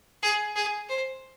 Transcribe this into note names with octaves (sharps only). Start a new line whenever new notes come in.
G#4
G#4
C5